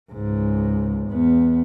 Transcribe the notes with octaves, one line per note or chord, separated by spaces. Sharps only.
C#2 G#2
E2 B3